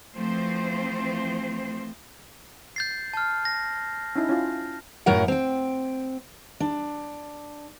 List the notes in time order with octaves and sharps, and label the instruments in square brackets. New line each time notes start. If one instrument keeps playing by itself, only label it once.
[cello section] E3 F3 A3 C4 C5
[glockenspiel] G6 A6 C7
A5 F6
A#6
[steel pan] C#4 D#4 E4
C#4 E4 F4
[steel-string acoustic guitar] F#2 A2 F#3 A#4 F#5
C4 G5
D4